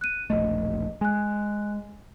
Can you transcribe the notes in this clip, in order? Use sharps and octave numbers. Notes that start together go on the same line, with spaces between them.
F#6 D#7
E1 A#1 A3 D#5
G#3 G#5 F#6